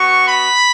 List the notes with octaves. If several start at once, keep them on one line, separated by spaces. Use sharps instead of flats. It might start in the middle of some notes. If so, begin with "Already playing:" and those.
Already playing: B3 F#4 C#6
B5